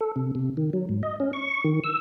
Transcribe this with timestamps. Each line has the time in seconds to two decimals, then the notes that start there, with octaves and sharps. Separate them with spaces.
0.01 A4
0.16 C3
0.35 C3
0.57 D#3
0.73 F#3
0.89 G#2
1.03 D#5
1.20 C#4
1.33 C#6
1.64 D#3
1.84 E6